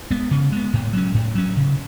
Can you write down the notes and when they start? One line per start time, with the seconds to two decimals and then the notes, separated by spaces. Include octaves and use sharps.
0.10 G#3 B3
0.31 C#3
0.52 G#3 B3
0.73 A2
0.93 F#3 C#4
1.14 A2
1.35 F#3 C#4
1.57 C#3